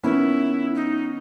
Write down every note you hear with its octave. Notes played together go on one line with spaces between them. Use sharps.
D#3 B3 C#4 E4
D#4